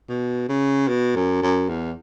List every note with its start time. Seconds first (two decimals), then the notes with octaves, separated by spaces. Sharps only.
0.09 B2
0.49 C#3
0.88 B2
1.16 F#2
1.42 F#2
1.69 E2